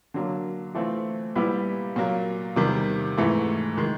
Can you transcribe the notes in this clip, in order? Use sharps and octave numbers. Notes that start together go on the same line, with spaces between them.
D3 F#3 A#3
E3 A3 C4 F4
A#2 G3 B3 E4 G4
A#2 F#3 A#3
E2 C3 D#3 G3
G#2 E3 A3
D#3 G#3